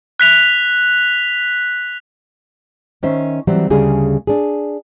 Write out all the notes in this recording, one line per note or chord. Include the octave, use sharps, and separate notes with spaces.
F#6 B6 F7
D#3 C#4 C5 E5
E3 F#3 G3 C4
D2 C#3 G3 G#4
D4 G#4